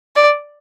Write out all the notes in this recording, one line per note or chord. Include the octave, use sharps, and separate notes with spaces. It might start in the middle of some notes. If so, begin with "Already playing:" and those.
D5